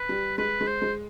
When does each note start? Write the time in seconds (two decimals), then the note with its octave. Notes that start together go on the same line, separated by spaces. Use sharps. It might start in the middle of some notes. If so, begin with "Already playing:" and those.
Already playing: B4
0.09 G3
0.38 G#3 B4
0.61 G#3
0.67 C5
0.82 G#3